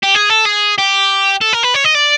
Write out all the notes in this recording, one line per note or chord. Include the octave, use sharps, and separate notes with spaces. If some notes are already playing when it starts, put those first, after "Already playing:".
G4
G#4
A4
G#4
G4
A4
A#4
B4
C#5
D#5
D5